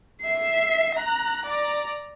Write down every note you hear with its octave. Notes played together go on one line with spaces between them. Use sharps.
E5 C7
A#5 F#6
D5 A#5